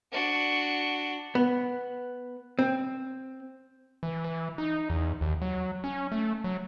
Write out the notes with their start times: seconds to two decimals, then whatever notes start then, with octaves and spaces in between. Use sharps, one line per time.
0.12 D4 F#4
1.35 B3
2.59 C4
4.03 E3
4.24 E3
4.58 D#4
4.90 E2
5.21 D#2
5.42 F#3
5.84 C#4
6.12 A3
6.44 F#3